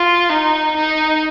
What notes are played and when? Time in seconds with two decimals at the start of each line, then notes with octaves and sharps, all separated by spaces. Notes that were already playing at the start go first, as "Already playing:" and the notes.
Already playing: F4
0.30 D#4
0.76 D#4